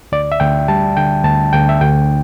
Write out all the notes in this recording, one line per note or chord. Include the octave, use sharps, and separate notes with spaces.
D2 D5
E5
D2 G5
G3 A5
D3 G5
D2 A5
D2 G5
E5
D2 G5